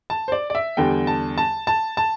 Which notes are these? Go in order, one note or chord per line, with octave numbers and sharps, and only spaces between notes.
A5
C5
D5
D5
E5
E2 D3 G3 G5
A5
A5
A5
A5